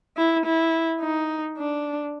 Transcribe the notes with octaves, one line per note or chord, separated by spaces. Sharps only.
E4
E4
D#4
D4